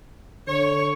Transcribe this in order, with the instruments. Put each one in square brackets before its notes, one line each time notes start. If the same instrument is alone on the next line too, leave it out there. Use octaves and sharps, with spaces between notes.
[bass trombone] D3 [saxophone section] C#5